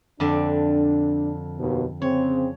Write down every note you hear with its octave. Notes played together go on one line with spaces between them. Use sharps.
F2 D3 D4 D5
D#2 B2
C#3 C4 C#5